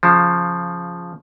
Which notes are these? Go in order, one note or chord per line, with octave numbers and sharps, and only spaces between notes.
C#3 F3